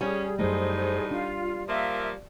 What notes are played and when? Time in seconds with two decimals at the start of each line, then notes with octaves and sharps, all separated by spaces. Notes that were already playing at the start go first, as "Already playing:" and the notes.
0.01 G3 C#4 G#4
0.39 F#2 A2 F#3 A3 D#4 G#4 C5
1.11 D4 F4
1.69 F3 A#3 E5